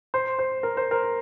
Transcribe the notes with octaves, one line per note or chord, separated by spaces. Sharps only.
C5
C5
A#4
C5
A#4